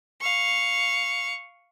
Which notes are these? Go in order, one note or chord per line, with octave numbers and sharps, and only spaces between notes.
F5 C#6